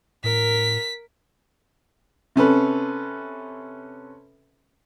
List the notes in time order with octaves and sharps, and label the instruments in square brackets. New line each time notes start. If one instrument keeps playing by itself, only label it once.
[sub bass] A2 [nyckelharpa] A#4 [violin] B6
[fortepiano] C3 C#4 A4 B4